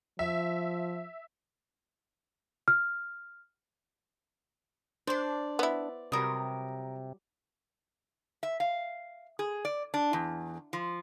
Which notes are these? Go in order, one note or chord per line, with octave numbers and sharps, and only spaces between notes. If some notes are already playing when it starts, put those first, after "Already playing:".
F3 E5
F6
D4 C5 D5 C6
B3 E4
C3 F#3 G3 A#4 D#6
E5
F5
G#4
D5
D4
E2
F3